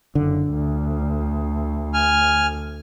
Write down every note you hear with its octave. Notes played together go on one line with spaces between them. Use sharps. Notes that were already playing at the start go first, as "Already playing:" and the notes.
F#1 D3
D2
G#5 F6